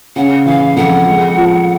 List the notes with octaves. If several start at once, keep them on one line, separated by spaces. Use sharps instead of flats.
C#3 F#5
E3 F5
F2 F#5
G#3
F3